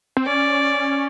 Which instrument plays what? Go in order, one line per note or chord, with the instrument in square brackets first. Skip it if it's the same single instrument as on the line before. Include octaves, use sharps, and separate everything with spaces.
[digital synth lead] C4
[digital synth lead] C#4 [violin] D5